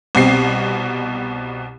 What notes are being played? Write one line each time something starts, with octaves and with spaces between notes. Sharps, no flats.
C2 B2 C4 C7